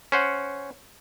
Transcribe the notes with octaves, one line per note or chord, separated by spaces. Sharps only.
C#4 C5 F#5